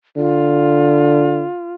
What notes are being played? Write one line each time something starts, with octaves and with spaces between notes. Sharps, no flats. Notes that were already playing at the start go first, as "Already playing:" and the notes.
D3 F4